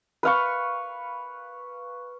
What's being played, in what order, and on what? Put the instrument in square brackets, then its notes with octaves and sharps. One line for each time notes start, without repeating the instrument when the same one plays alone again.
[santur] B4 F5 C#6